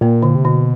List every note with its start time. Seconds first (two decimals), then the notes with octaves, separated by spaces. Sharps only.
0.01 A#2 A#3
0.23 D3
0.35 C3
0.45 B2 D3